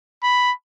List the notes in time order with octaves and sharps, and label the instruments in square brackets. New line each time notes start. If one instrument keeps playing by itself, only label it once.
[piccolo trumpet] B5